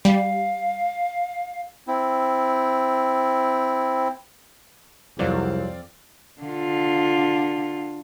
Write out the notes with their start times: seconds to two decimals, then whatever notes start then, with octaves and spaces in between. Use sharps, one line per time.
0.05 G3 F5
1.88 C4 E4
5.19 C2 F2 F#3 C4 D5 F5
6.42 D3 F4